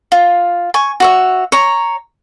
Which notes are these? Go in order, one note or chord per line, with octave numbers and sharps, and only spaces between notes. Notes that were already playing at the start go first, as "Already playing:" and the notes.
F4
G#5 C#6
F#4 C#5 E5
C#5 A#5